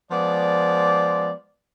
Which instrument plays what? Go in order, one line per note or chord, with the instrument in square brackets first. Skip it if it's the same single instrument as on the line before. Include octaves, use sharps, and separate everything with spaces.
[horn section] F3 G#3 B3 D5